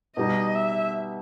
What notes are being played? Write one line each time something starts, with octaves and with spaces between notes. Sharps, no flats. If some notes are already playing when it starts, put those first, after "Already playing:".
B2 G3 D#4 D#5
E5